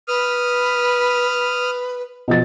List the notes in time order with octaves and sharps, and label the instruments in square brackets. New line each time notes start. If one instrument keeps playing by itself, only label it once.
[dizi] B4 [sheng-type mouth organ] D#6 F6
[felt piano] B2 F3 A6